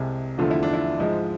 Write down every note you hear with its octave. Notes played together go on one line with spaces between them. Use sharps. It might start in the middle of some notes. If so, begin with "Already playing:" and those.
Already playing: C2 C3 G#3 G#4
E2 D3 F3 A3 F4
E4
D4
E4
G#2 F3 G#3